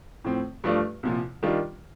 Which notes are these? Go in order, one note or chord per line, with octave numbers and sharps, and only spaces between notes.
A2 F3 C4
G2 F3 A3 D4 F4
C2 A#2 F3
D#3 G3 D4 F4